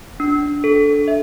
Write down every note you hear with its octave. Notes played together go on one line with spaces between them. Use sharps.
D4
A4
E5